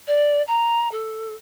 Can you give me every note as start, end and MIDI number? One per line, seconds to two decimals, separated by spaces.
0.07 0.42 74
0.47 0.90 82
0.91 1.34 69